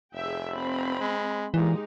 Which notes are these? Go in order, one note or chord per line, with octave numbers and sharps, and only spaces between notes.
F1 G#4 E5 G5
C4 B5
G#3
A#2 E3 G#3 D#4 G4